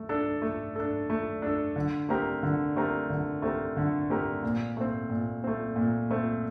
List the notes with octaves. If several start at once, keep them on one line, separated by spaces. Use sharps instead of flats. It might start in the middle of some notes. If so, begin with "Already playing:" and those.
Already playing: A3
D4 A4
A3
D4 A4
A3
D4 A4
D3
A3 C4 G4 A#4
D3
A3 C4 G4 A#4
D3
A3 C4 G4 A#4
D3
A3 C4 G4 A#4
A#2
A3 C4
A#2
A3 C4
A#2
A3 C4